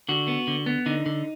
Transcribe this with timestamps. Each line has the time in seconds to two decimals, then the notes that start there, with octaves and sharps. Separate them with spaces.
0.09 D3 F#4
0.28 B3
0.47 D3
0.66 B3
0.86 D3 D#4
1.06 D3